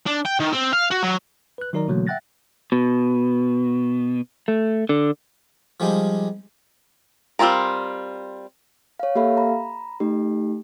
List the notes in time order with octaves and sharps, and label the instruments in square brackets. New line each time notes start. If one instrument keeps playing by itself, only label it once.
[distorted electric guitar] D4
G5
D#3
C4
F5
F#4
F#3
[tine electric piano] B4 F#6
D#3 F#3 D#4 A#4 D5 A#5
B2 D3 E3 F#3 A3 A#3
E5 F#5 G5 F#6 A6 A#6
[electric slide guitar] B2
A3
D3
[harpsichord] F3 G3 G#3 D#4
[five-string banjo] G3 C4 C#4 F4 A#4
[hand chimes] C#5 F5
A#3 G4 A4 E5 F5 B5
A#5 B5
A3 D#4 G4